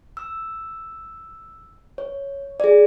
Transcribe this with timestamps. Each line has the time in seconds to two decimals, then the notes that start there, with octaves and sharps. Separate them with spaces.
0.17 E6
1.98 C#5
2.60 G#4 D5